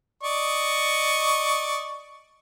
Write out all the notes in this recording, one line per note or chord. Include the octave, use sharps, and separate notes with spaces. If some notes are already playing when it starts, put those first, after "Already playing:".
D5 D#5 C#6